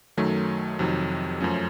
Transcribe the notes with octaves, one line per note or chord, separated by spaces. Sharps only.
F#2 D#3 F#3 A3
F2 C3 D#3 F#3
F#2 F3 A3 C#4